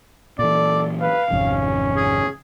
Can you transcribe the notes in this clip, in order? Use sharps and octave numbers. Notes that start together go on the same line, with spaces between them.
A#2 E3 A4 D5
B4 F5
G#1 F2 C3 C#4
G#4